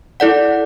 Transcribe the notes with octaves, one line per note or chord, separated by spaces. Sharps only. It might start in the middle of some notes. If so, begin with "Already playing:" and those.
E4 A4 D5 F#5